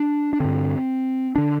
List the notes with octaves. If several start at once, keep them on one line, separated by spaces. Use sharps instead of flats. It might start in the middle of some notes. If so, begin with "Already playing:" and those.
Already playing: D4
D4
G2 D3 C4
D3 D4